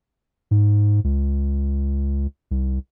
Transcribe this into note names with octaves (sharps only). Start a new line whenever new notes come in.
G#2
C#2
C2